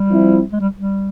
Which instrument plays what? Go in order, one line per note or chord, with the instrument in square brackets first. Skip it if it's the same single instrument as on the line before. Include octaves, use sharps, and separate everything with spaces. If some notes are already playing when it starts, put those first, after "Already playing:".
Already playing: [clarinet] G3
[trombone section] F3 C4 E4
[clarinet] G#3
G3
G3